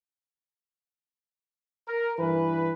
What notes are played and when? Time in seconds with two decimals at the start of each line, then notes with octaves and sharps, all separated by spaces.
1.88 A#4
2.18 G2 E3 B4